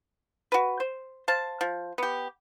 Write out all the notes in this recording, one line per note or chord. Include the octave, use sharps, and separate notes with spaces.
F#4 B4
C5
C5 F5 A5
F3
B3 G4